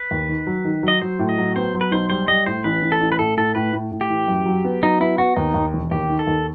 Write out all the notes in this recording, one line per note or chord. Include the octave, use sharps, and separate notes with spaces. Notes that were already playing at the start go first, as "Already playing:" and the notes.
Already playing: B4
D#2
D#3
F#3
D#3
F#3 D#5
F#3 C5
A2
D#5
F#3
B3 C5
F#3
B4
B1 C5
G3 C5
G3 D#5
A2 C5
A1 B4
A1
A4
A1
B4
A2 A4
A2 A4
A2 B4
A2
A2
G4
E3
F#2
F#3
B3
F#3 D#4
B3 E4
B3 F#4
D#2 D#4
D#2
E1
D#2 G4
D#3
A4
D#2